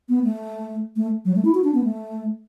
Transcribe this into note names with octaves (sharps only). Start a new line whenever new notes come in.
B3
A3
A3
F#3
A3
E4
F#4
D4
B3
A3